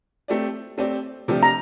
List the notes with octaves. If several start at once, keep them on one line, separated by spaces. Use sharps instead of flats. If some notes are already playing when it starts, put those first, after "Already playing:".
A3 C4 G4 D5
A3 C4 G4 D5
C3 F3 A3 D4 G4
A#5